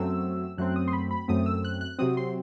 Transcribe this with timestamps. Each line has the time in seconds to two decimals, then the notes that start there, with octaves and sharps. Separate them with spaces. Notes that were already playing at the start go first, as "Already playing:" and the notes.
Already playing: F#2 F#3 A3 C4 E6
0.58 F#2 F#3 A3 C4 F#6
0.76 D#6
0.88 C6
0.93 B5
1.11 B5
1.28 F#2 F#3 A3 C4 D#6
1.46 E6
1.65 F#6
1.81 F#6
1.99 C3 F#3 C4 D#6
2.17 C6